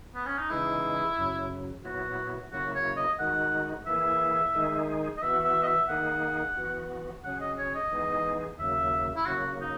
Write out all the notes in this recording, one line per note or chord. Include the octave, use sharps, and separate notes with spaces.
B3
C#4
D#4
C#3 E3 G#3 D#4 E4 G#4
F#2 C#3 F#3
A#2 F#3 B3 E4 F#4
C#3 F#3 A#3 E4 F#4
C#5
D#5
D#3 G#3 D#4 F#4 F#5
E3 A#3 E4 G#4 E5
D#3 G#3 D#4 G#4
D#5
E3 B3 F#4 E5
E5
D#5
E5
D#3 A#3 D#4 G#4 F#5
E3 B3 F#4
C#3 F#3 C#4 G#4 F#5
D#5
C#5
D#5
E3 G#3 B3 D#4 G#4
D#2 C#3 F#3 A#3 E5
E4
C#3 F#3 A#3 F#4
D#4